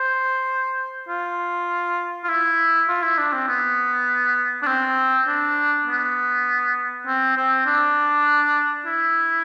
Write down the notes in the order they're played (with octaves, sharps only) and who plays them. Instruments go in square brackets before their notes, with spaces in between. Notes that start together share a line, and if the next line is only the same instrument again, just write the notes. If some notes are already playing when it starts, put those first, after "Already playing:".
Already playing: [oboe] C5
F4
F4
E4
F4
E4
D4
C4
B3
D4
C4
D4
B3
C4
C4
D4
E4